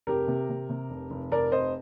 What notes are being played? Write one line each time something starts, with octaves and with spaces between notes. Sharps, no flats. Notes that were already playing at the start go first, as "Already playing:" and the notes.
F1 G4 A#4
C3
C3
C3
F1
F1
F1 A#4 D5
F1 C5 D#5